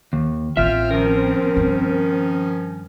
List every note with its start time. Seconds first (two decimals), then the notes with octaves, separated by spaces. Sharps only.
0.13 D#2
0.57 A1 C4 F4 E5 G5 F6
0.91 D#3 F3 C#4 A#4
1.57 G2